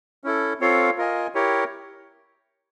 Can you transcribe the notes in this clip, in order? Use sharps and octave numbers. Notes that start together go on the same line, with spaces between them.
C#4 E4 A4
C4 F4 A4 C#5 F5
F4 A#4 D#5 G#5
E4 G4 A#4 C#5